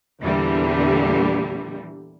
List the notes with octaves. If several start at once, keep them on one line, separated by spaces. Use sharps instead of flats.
E2 A#2 D3 E3 G3